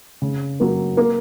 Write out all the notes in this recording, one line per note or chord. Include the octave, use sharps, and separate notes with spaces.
C#3
F#3 A#3
A#3